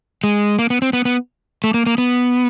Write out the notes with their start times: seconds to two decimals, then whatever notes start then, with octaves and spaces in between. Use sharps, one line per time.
0.24 G#3
0.59 A#3
0.70 B3
0.82 C4
0.93 B3
1.05 B3
1.64 A3
1.74 A#3
1.87 A#3
1.98 B3